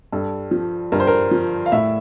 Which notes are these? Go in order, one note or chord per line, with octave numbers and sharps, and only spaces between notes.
G2 A4
F3
G2 A#4
C5
A#4
F3
F5
A2 E5